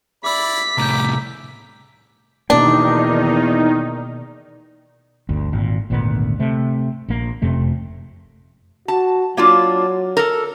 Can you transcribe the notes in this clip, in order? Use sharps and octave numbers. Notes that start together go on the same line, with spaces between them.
E4 D5 B5 D6 E6 B6
C2 A2 A#5 D6 G6
E2 B2 D#3 A#3 D4 D#4
G1 D2
G#1 A#2
G#1 D2 A#2 B3
C3 A3
A#1 A#3
F#1 F2 C3 A3
F#4 A5
F#3 A#3 D4 F4
A4 A#4